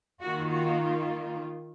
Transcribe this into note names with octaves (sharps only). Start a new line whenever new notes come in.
D#3 A#3 F4 F#4
F#4